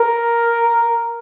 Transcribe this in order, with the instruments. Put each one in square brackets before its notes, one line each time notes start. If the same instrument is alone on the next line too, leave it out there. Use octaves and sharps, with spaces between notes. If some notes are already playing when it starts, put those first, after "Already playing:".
Already playing: [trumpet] A#4